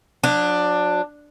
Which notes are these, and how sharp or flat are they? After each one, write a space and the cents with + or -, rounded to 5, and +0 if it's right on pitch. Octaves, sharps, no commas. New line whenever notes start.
F#3 -40 D4 +10